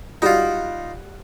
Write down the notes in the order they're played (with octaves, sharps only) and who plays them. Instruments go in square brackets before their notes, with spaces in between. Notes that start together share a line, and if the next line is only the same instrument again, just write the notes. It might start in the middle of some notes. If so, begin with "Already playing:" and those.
[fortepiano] G3 F#4 [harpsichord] D#4 F4